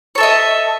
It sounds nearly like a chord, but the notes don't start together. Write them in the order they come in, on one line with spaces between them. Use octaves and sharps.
C#5 A4 E5 D#5